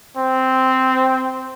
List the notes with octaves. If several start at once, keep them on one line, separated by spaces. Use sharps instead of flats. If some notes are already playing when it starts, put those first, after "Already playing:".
C4